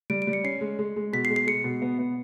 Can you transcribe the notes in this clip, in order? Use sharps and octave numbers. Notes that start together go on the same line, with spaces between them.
G3 D7
D7
G3
C#7
C#4 C7
G#3
G#3
G#3
B2 B6
C7
G#3
C7
G#3 C#7
B2
B3
B3